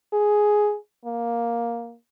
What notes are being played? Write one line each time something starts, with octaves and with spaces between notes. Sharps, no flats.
G#4
A#3